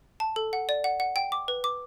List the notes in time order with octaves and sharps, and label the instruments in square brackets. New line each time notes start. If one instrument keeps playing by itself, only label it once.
[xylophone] A5
A4
F#5
D5
F#5
F#5
G5
D6
B4
D6